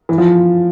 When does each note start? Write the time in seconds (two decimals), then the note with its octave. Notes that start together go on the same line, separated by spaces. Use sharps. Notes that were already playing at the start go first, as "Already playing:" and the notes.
0.09 E3
0.18 F3